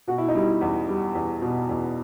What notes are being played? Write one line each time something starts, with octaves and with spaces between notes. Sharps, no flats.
B2 F#4
E4
D#4
G3 E4
E2
G3
E2
B2
E2